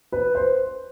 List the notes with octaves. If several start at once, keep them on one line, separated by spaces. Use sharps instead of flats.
B4
C5